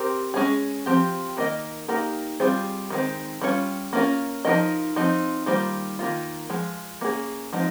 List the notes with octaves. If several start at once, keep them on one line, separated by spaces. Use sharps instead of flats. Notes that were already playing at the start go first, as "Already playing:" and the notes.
Already playing: C4 G4 A#4
G#3 C#4 G#4
F3 C4 G4
D#3 A#3 D#4 A#4 D#5
A#3 D#4 G4 A#4
G3 C4 F4 G#4 C5
D#3 G#3 C4
G3 C#4 F4 G#4 C#5
A#3 C#4 F4 A#4
F3 G#3 D#4 A#4 D#5
F3 C4 D#4
D#3 G3 A#3 F4 C5
D#3 A#3 F4
F3 G#3
A#3 C#4 G#4
F3 G#3 C4 D#4